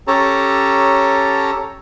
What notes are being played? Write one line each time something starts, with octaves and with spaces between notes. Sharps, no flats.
C#4 G4 A4 C#5 A5 A#5